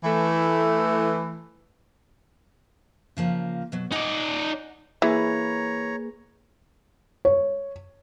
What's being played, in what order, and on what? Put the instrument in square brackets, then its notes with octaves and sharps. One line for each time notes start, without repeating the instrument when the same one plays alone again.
[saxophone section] E3 A3
[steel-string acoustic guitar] C#3 F3 A#3
B2 F#3
[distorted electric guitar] D#4 D5 [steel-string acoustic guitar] D#5 F#5 G#5
[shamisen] E3 [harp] A#3 G#4 B4 [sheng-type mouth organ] C#5 A#5
[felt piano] C#5